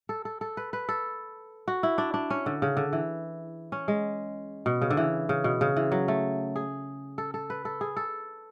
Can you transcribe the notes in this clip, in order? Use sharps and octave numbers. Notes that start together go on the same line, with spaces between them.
A4
A4
A4
B4
B4
A4
F#4
E4
D4
D4
C#4
D3
C#3
D3
E3
C#4
G#3
B2
C#3
D3
E3
C#3
B2
C#3
E3
F#3
A3
G#4
A4
A4
B4
A4
G#4
A4